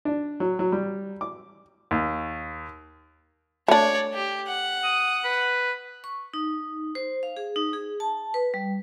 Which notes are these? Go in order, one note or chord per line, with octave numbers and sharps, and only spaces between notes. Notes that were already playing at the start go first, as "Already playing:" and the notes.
D4
F#3
F#3
G3
D6
D#2
A3 D4 C#5 D5
G4
F#5
D#6
B4
C#6
D#4
C5
F5
G#4
D#4
G#4
A5
B4
G3